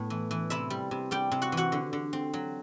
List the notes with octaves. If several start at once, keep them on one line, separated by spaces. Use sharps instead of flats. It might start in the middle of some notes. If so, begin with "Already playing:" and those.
Already playing: A2 B3
E3
E3
C3 E4 E5
G3
C3
G3 G4 G5
C3
F#4 F#5
E3
F#4 F#5
D3
D3
C4
F#3